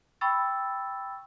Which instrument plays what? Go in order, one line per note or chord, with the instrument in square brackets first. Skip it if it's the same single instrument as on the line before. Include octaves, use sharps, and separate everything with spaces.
[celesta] G5 B5 C#6 E6 A6